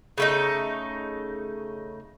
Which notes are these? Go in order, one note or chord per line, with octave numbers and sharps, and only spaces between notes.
C#3 A3 D#4